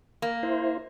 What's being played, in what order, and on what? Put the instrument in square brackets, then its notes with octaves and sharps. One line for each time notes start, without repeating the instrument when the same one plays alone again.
[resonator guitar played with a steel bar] A#3
[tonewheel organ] E4 C5